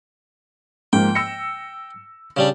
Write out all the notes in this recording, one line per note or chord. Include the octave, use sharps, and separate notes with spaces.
G#2 F3 A#3 G5
E6 A#6 C#7
C#3 G3 D4